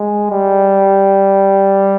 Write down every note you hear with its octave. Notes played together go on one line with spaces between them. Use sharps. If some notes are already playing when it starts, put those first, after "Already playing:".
Already playing: G#3
G3